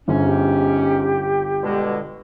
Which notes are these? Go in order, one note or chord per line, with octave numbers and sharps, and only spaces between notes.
G1 G#2 C#4
G4
B2 D3 G#3